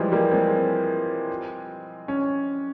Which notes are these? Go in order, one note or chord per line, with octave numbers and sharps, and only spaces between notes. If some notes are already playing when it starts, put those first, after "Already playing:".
Already playing: E3 F3 G3 G#3
G3 A#3
G#3 C4
C#4